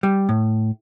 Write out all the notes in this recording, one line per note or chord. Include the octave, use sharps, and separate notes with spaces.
G3
A2